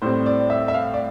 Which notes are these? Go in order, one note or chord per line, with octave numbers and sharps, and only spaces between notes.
A2 G3 C4 C5
D5
E5
E5
F5
D5